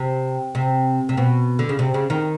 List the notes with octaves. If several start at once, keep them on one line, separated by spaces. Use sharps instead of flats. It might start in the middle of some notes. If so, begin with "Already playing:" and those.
Already playing: C3
C3
C3
B2
D3
C#3
C3
C#3
D#3